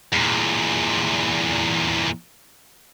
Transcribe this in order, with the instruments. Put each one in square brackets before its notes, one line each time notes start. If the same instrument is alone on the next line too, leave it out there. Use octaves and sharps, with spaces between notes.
[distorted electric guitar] E2 A#2